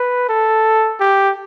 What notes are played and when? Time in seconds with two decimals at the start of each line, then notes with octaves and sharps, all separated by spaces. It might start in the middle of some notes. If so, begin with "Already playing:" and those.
Already playing: B4
0.29 A4
1.00 G4